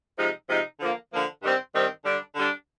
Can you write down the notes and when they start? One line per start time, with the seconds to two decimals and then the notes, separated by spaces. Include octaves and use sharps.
0.17 C3 F3 G#3 D#4
0.48 C3 F3 G#3 D#4
0.80 D3 F3 A#3
1.11 D3 F3 A#3
1.43 G2 D#3 G3 C4
1.74 G2 D#3 G3 C4
2.05 D3 G3 D4
2.36 D3 G3 D4